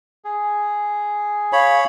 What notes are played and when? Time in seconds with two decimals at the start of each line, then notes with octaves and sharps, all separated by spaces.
0.24 G#4
1.53 C#5 F5 B5